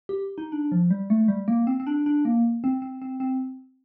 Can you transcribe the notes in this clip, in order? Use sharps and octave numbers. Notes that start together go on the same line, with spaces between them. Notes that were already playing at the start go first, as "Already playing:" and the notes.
G4
D#4
D4
F3
G3
A3
G3
A#3
C4
C4
D4
D4
A#3
C4
C4
C4
C4